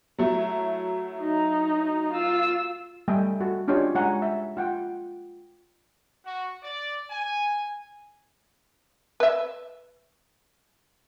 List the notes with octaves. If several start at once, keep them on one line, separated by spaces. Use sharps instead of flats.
F#3 A3 E4
D#4
F4 E6
G3 A3 D#5 E5 G5 G#5
F#4 A4
C#4 D4 F4 G4 C#5 D#5
G#3 C#5 F#5 G#5 A#5
E5
F4 F#5 G5
F#4
D5
G#5
B4 E5